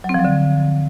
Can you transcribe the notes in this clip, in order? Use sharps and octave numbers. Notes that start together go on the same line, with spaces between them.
F#3
C4
F3
F#3
D3